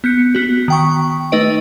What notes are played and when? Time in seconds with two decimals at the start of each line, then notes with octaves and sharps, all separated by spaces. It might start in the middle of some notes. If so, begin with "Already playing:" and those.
0.04 B3 F#6 G6 C#7
0.35 B3 F#4
0.68 D#3 G5 C#6
1.32 A3 D#4 B4 D#5 D7